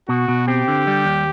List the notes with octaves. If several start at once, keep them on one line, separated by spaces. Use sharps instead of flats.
B2 F#4
B2
C4 G4
D3
G3
D#2